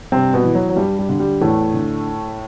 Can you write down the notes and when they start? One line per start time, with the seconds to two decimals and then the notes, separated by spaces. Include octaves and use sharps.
0.12 G2 C3 C4
0.34 B2 B3
0.44 E3
0.55 F#3
0.69 F#3
0.76 G2 G3
0.99 G3
1.09 D3
1.20 G3
1.41 E2 A2 A3
1.74 D3